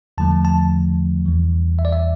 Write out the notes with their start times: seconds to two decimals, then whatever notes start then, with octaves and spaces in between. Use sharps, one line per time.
0.18 E2 D3 F3 A3 A5
0.45 A5
1.25 E2 E3 G3
1.79 E5
1.85 D5
1.92 E5